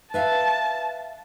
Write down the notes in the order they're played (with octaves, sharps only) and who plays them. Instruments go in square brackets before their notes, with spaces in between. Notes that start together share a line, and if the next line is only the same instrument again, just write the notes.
[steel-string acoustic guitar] B4 E5 F5 [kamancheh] A5